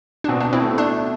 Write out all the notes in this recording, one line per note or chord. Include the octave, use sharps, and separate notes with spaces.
D4
B2 C4
D4
B2
C4 E4
A3
D4 E4